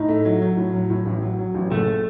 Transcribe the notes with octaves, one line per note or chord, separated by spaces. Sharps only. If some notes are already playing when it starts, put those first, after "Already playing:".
Already playing: A2 D#4
A3
F#3
F#3
A2
F#3
A2
A1
F#3
F#3
A1
F#1 A3